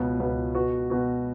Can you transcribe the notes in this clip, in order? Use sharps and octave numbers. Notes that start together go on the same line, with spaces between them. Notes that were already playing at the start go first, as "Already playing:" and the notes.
Already playing: C#2 B2 B3
C#2 B2 B3
B2 B3 F#4
B2 B3 F#4